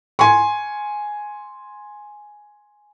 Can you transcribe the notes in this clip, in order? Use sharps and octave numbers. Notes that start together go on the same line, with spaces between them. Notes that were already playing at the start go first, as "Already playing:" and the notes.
G#5 C6 C#6